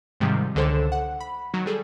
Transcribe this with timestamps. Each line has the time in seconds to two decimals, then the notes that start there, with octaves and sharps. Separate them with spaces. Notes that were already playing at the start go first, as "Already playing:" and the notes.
0.20 G#2 C3 D#3 F3 G3 G#3
0.55 C#2 D3 D#3 A4 C5 E7
0.92 F#5
1.20 B5
1.54 D#3 F#3 F#4
1.66 G3 G#4 A4